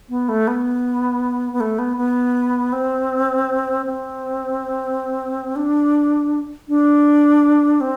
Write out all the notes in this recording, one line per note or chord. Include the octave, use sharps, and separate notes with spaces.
B3
A3
B3
B3
A3
B3
B3
C4
C4
D4
D4
C4